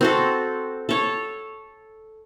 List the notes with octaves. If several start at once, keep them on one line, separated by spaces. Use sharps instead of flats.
C4 F#4 A4
A4 C#5